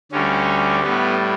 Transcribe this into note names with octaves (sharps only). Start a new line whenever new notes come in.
D2 D3 G3 C#4
A2 G3 B3